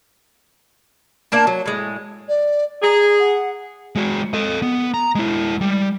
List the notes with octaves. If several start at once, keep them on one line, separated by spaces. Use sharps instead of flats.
A#3 D4 A5
F#3
A2 G#3
D5
G#4 A#5
F#5
G#3 F#4
A4 D#5
B3
A#5
G#3 E4
G3